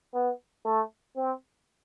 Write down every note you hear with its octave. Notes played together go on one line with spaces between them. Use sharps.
B3
A3
C4